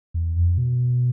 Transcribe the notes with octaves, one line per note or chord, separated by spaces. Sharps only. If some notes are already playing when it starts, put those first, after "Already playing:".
E2
F2
B2